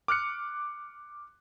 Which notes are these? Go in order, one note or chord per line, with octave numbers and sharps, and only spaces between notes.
D6 F6 F#6 C#7